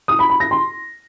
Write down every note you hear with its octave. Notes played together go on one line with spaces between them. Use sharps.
D#6
B5
B5
A#6
C6